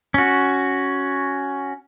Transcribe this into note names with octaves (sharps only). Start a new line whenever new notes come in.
C#4 F#4